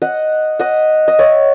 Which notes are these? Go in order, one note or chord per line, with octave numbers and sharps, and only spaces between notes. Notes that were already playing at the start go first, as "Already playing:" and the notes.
D#5 F#5
D#5 F#5
D#5
C#5 E5